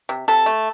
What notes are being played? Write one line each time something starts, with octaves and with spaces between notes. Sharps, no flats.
C3
C3 A4
A3